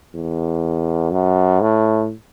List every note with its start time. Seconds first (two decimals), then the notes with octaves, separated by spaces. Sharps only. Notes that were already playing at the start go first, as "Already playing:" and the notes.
0.15 E2
1.11 F#2
1.61 A2